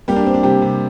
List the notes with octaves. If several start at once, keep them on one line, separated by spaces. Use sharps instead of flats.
G3 A#3 G4
D4
A#3 C4
D4
C3 G3 G4
C3